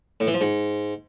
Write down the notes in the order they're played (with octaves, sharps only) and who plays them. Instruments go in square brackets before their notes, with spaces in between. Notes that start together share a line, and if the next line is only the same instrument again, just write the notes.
[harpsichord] A2
E3
F3
G#2